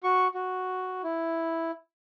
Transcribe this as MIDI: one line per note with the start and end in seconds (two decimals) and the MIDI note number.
0.04 0.28 66
0.04 0.28 85
0.34 1.02 66
1.04 1.71 64